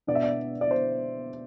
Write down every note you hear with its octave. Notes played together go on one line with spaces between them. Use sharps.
B2 B3 D4 D5
E5
D5
D5
C5